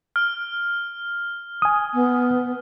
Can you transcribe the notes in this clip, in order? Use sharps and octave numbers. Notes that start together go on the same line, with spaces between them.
F6
G#5 D#6
B3